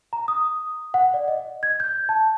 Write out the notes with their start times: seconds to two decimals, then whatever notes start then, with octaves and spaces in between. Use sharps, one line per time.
0.13 A#5
0.28 D#6
0.94 F#5
1.14 D5
1.28 D#5
1.63 G#6
1.80 G6
2.09 A5